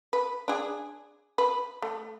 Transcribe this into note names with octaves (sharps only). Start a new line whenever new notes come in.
B4
D4 G#4
B4
A3